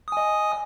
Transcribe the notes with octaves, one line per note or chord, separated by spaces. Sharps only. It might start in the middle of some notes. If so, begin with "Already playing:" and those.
D#5 G#5 D#6